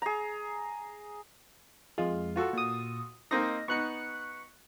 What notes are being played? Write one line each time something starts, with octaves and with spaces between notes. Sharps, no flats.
G#4 A#5
F2 G#3 F4
F4 F#4 A4
A#2 D#6
A#3 C4 D#4 D#5 A#6
B3 D#4 C#6 F#6 C#7